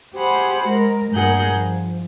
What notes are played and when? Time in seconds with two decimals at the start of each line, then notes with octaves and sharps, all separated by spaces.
0.15 G4 G#4 C5 F#5 B5
0.67 G#3 A#4
1.11 G2 A#2 G#4 A#4 F#5 G6
1.51 F3